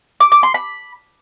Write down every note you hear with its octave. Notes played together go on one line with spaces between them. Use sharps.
D6
D6
C6
B5